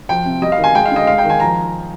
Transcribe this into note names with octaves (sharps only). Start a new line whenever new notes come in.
F3 G5
C3
G3 D#5
F5
D#3
G#5
G#3 G5
F5
D3 D#5
G#3 F5
G5
D#3
G#5
F3 A#5